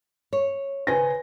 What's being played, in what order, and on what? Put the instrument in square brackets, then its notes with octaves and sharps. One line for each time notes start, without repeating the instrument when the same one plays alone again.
[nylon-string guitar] C#5
[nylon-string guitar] C#3 C5 [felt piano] B4 G#5 A#6